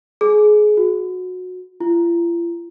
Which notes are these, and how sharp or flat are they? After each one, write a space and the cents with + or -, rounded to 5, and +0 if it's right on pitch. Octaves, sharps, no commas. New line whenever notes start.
G#4 +25
F#4 -20
F4 -45